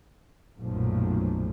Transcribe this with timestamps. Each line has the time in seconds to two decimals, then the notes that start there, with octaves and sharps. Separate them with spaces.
0.57 B1 F#2 A#2 F3 A3